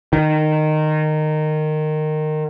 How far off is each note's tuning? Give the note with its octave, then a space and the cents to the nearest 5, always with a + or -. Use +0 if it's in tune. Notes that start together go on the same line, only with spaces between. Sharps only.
D#3 -15